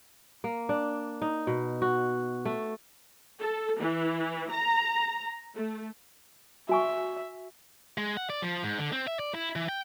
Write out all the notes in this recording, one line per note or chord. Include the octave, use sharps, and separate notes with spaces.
A#3
D4
D#4
B2
F#4
A3
A4
E3
A#5
A3
F#4 E5 G#5 C#6
G#3
F#5
D5
F3
G#2
D3
C4
E5
D5
E4
E3
G5